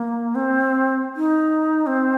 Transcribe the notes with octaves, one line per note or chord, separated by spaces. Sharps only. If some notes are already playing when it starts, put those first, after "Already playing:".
Already playing: A#3
C4
D#4
C4